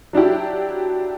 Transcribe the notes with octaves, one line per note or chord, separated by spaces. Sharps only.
F#3 D4 E4 G4